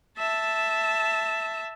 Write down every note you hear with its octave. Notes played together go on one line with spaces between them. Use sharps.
E5 A5